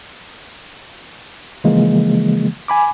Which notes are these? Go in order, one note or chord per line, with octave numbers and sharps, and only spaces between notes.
C#3 E3 F3 G#3 A#3
G#5 B5 D6